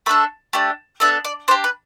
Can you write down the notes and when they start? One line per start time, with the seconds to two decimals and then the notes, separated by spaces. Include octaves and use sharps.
0.06 A3 D4 A4 B5
0.53 A3 D4 G4
1.00 B3 D4 A4 E5
1.25 D5
1.48 D4 C5
1.51 G4
1.64 B4